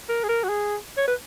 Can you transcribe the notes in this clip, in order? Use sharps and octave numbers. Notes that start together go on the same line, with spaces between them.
A#4
G#4
A#4
F#4
G#4
C#5
B4